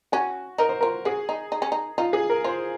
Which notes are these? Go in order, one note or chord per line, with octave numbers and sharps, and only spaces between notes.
C#4 F#4
D#4 A#4
C5
F4 A#4
F#4 G#4
D#4
D#4
C#4
D#4
D#4 F4
G#4
A#4
F4 C5